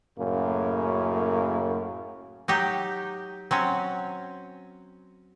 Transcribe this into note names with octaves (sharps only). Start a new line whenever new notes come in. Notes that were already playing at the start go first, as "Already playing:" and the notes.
F#2 A2 C#3 A#3
F#3 D#4 G4
F#3 C4 C#4